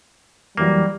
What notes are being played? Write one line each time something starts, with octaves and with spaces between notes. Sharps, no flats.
F2 E3 F#3 G3 A#3